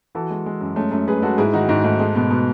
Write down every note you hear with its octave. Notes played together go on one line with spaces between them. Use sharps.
E3 F#4 A4
G#3
G#3
F#2
G#3 A3 C#4
F#2 A3 C#4
F#2 G#4 B4
G#3 F#4 A4
G#2 E4 G#4
D#3 D#4 F#4
G#2 D#4 F#4
G#2 A3
G#3 A3
B2 B3
B2 B3